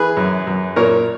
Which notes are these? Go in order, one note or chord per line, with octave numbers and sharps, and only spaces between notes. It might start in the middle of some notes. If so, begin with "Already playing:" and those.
Already playing: E3 G#4 B4
F#2
F#2
A#2 A#4 C#5